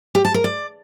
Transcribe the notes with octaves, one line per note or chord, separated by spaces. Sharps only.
G4
A5
A#4
D5